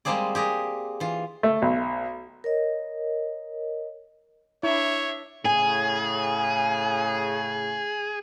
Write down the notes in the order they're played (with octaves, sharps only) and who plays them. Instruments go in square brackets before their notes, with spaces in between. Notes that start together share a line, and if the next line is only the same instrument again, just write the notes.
[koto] G3 G#3 A#3 C4 G#4 D5
G4 G#4 A#4
E3 F4
[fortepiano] A3
B1
[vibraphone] A#4 C#5 D#5
[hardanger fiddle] D4 E5 [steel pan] E4 [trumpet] C#5
[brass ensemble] A2 C#3 [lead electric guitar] G#4 [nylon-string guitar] G#5